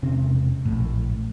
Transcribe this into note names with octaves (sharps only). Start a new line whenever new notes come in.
E1 C3 C4 C#4
A#1 A2